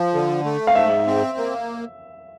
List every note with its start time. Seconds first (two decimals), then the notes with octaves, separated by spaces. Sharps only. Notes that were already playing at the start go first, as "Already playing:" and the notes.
Already playing: F3
0.14 D3
0.45 A3
0.67 F5
0.75 G#2 E5
1.07 C4
1.37 A#3